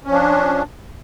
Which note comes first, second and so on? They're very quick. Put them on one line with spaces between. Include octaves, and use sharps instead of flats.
C#4 F3 D4